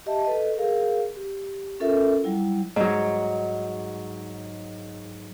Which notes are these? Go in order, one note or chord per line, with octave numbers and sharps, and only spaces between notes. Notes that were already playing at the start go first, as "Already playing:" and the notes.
G4 D#5 E5 A5
A4 B4 D#5
G#4 A#4 F5
G4
C#4 F4 A4 A#4 E5
F#3 G3 E4
G#2 F#3